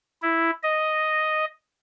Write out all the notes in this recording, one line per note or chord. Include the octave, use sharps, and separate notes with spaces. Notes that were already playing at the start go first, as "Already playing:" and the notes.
E4
D#5